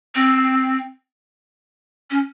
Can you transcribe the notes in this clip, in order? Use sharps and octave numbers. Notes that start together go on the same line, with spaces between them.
C4
C#4